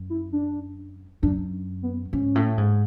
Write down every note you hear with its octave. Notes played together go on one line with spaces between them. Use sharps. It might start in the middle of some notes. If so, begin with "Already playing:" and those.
Already playing: F#2
E4
D4
F#2 D4
B3
G#2 C#4
A2
G#2